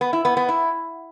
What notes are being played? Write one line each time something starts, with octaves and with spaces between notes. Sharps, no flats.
B3
E4
B3
B3
E4